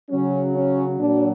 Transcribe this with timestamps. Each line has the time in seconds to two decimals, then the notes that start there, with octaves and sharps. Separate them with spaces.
0.10 C#3 F#3 C#4
0.55 C#4
0.99 A#2 F#3 D4